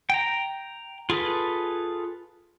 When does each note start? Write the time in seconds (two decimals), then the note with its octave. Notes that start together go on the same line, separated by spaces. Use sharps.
0.10 G5 A#5
1.10 F4 G#4 A4 B4